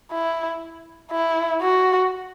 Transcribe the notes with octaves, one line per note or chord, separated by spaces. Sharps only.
E4
E4
F#4